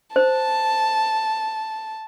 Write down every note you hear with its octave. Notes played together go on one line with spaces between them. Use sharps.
C5 A5